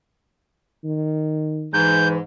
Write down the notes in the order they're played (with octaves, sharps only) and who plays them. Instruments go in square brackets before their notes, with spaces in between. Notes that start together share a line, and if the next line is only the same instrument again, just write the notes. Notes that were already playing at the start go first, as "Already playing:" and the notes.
[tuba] D#3
[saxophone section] G#2 [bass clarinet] E3 [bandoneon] G6